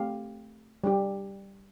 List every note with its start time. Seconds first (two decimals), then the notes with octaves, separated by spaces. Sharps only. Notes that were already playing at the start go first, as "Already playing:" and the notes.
Already playing: A3 C4 G4 F5
0.84 G3 D4 G4